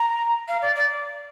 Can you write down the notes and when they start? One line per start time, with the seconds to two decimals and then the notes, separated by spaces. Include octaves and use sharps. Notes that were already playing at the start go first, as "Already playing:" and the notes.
Already playing: A#5
0.48 F5
0.62 D5
0.75 D5